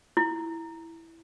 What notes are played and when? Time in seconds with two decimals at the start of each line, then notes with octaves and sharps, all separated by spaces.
0.17 E4